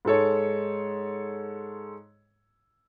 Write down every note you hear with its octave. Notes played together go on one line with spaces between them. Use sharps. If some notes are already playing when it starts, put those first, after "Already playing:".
G#2 G#3 A4 C#5